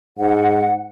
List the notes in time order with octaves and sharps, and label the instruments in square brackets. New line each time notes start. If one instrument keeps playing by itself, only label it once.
[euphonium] G#2 [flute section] F#5